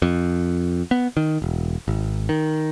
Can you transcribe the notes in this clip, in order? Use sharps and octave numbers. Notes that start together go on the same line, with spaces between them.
F2
B3
D#3
E1
G#1
D#3